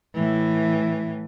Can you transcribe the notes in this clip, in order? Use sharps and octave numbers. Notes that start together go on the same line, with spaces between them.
A2 E3